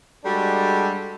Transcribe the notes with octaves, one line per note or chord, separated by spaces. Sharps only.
G3 G#3 D4 F#4 A4